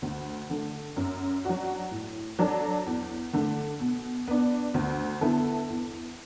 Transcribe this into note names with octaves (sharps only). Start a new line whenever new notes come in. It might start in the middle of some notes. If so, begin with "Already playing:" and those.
D2
D3 A3
F#2
F#3 D4 F#4
A2
F#3 D4 A4
E2
D3 A3
B2
B3 D4
D2
D3 B3 E4 A4
E2